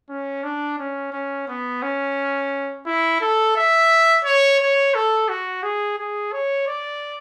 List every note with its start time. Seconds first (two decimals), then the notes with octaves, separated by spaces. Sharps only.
0.09 C#4
0.43 D4
0.79 C#4
1.13 C#4
1.48 B3
1.83 C#4
2.86 E4
3.21 A4
3.56 E5
4.25 C#5
4.60 C#5
4.94 A4
5.29 F#4
5.63 G#4
5.99 G#4
6.33 C#5
6.67 D5